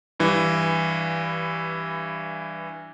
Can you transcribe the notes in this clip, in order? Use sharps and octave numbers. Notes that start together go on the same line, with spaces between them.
G2 E3